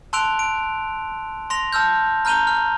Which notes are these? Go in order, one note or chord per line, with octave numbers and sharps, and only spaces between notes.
A5 C6 E6 F#6 D7 F7
D7
C6 A#6 F7
A5 E6 F6 G6
A#5 F6 G6 D#7 F7 G7
F6